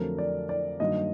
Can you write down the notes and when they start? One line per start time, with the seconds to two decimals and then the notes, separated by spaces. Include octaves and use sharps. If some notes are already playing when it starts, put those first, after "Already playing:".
Already playing: F2 D3 F#3 A3 A#4
0.18 D5
0.49 D5
0.80 G2 D#3 F#3 A#3 D#5